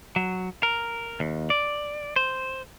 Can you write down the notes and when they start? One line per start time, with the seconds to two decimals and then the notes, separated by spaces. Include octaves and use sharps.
0.16 F#3
0.63 A#4
1.20 D#2
1.50 D5
2.16 C5